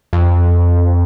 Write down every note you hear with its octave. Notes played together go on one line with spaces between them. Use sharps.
F2